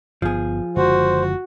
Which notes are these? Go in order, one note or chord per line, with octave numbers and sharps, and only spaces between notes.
G1 F3 B3 G#4
F#1 D3 G#3 F#4 C5